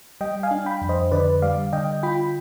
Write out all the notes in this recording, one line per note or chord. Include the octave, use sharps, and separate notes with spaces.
G3 D#5 G5
F5 G#5
D4
G5 B5
F2
C5 D#5
D3 B4 D5
G3 D5 F5
D3 D#5 G5
F4 G5 B5